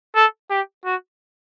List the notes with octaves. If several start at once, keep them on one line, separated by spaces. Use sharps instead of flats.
A4
G4
F#4